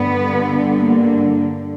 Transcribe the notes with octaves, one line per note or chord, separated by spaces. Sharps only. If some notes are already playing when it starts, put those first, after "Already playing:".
Already playing: G2 D3 B3
A#3